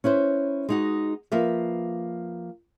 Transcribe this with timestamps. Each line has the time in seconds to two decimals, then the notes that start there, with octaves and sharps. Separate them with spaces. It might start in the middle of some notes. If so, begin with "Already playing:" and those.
0.04 C#4 E4 B4 C5
0.69 G#3 D#4 F#4
1.32 F3 A#3 B4 E5